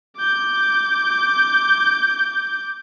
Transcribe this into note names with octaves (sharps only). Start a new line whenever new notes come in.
D6 G6